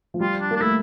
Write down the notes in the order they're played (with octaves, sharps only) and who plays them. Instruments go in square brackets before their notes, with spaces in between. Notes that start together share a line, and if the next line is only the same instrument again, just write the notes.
[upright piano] F3
[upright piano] G3 [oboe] F4
[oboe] D4
[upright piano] A#3
[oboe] D4
[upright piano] A3 [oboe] E4